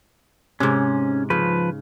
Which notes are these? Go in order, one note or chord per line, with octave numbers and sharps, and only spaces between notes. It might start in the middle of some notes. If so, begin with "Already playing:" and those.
G#2 C3 C#4
C#3 F3 B4